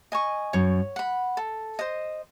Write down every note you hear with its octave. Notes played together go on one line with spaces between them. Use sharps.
D#5 G#5 C#6
F#2 C#5
F#5 B5
A4
C5 D#5